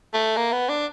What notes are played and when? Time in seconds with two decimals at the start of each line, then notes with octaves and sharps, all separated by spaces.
0.14 A3
0.37 A#3
0.52 B3
0.69 D4